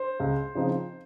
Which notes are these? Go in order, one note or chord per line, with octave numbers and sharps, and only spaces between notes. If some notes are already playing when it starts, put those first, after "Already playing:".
Already playing: C5
C#2
C#3 F3 C4 D#4